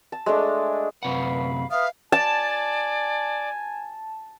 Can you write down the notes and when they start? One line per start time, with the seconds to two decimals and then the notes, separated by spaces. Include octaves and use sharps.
0.12 A5
0.26 G#3 A3 D4
1.03 F#2 C3 B4 F5 F#5 B5
1.71 B4 E5 F5 D#6 F6
2.12 D5 G#5 A5